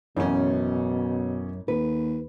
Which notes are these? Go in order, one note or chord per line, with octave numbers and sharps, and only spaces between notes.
A1 F#2 B2 C#4
D#2 B4